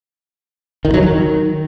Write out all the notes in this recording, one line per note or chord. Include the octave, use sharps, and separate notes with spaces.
D#3
F#3
D#3